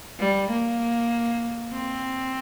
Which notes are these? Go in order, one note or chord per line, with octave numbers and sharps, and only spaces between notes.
G3
A#3
C4